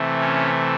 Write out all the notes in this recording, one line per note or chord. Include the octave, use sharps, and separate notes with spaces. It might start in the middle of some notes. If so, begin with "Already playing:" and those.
Already playing: C3 E3 A3
C#4